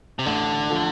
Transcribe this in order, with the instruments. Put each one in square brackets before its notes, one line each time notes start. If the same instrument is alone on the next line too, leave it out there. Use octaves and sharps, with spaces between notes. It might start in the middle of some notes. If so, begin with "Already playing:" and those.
[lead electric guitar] C3
[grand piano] A1 [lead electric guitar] D3
[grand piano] F3 A3